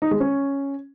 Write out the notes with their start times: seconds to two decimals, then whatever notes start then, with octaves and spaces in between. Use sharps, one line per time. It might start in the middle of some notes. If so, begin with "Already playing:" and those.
0.02 D#4
0.11 G#3
0.20 C#4